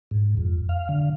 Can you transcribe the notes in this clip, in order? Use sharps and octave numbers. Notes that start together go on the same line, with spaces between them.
G#2
F2
F5
D3